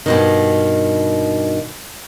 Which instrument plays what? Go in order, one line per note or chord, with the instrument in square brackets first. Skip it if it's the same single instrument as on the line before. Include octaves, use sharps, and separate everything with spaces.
[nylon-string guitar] G2 B2 D#3